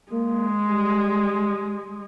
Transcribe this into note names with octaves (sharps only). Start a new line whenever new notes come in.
G#3 A#3
G3